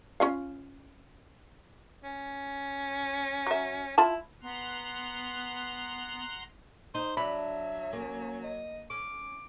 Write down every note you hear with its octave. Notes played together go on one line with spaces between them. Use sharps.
C#4 F4 F5
C#4
F#3 E5
E4 F4 A5
B3 F#5 A#5 C6
D#4 C5
F#3 D4 E5 B5
A#3 C#4
D#5
C#4 D6